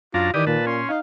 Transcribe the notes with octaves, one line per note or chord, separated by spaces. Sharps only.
F#2 D4 F4 A#5
D#3 E3 G4 D5 D#6
A#2 B4 A5
C#4 C6
D#4 F5